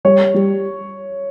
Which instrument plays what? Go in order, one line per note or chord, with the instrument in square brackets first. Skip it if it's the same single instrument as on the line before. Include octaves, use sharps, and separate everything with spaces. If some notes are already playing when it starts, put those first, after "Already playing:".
[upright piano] G3 [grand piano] C#5
[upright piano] G3